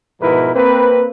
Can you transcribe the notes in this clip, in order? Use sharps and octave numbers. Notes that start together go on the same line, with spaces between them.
G#2 B2 F3 E4 A#4 B4
A#3 C4 B4